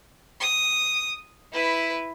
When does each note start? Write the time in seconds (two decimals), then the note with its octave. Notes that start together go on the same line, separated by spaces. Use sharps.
0.41 D#6
1.53 E4 B4